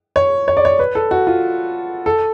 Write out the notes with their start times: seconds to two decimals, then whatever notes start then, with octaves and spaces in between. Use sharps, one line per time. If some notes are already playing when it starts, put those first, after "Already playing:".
0.16 C#5
0.48 C#5
0.57 D5
0.65 C#5
0.79 B4
0.95 A4
1.11 F#4
1.27 F4
2.06 A4